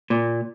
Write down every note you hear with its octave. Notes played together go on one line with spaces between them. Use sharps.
A#2